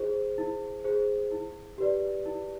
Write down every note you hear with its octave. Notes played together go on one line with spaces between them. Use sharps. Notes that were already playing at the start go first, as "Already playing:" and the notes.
Already playing: E4 G#4 C5
E4
G#4 C5
E4
G4 B4 D5
E4